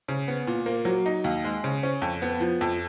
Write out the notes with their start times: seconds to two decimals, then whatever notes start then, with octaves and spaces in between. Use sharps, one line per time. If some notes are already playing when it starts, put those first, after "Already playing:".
0.08 C#3
0.28 B3
0.47 A#2
0.66 A#3
0.85 F#3
1.06 D#4
1.24 D#2
1.44 G#3
1.64 C#3
1.83 C#4
2.02 F2
2.22 B3
2.40 F3
2.61 F2